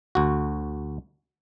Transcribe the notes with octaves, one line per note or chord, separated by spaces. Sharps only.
D2 F#4